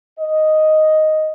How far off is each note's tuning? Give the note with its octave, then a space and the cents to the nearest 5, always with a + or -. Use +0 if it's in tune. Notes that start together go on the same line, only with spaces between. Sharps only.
D#5 +0